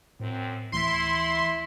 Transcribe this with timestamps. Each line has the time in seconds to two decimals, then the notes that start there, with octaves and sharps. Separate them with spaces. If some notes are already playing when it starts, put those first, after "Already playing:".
0.20 F#2 A2 C4
0.72 D2 E3 A3 E4 C6 B6 C7